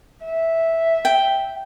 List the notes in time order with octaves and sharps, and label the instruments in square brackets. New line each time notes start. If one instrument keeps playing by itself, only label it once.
[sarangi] E5
[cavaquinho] G5